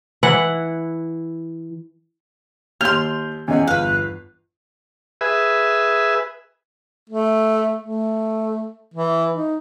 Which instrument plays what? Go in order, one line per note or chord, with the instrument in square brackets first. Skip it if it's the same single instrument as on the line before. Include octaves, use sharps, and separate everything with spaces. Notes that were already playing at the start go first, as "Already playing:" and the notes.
[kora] E3 E4 F#5
[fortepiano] D#2 [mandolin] C6 F6 [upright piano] G6 F7
[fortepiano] E2 F#5 [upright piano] C#4 D#5 [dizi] G#5
[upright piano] G1 [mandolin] B4 F5 [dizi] F#6
[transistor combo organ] G#4 B4 E5
[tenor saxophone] A3
A3
E3
D#4